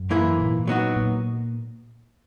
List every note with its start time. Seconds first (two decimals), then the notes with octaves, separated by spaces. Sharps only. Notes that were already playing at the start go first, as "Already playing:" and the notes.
Already playing: F#2
0.10 G#2 E3 A#3 E4 G#4
0.39 A#2
0.67 F#3 B3 D#4 F#4
0.96 A#2